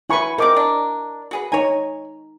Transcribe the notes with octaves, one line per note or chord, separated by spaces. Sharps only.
E4 F#4 A#4 B4 G#5 C#6
F3 G3 C4 A#4 D#5 D6
D4 A#5
F#4 G#4 B4
D#4 C#5 G#5 A#5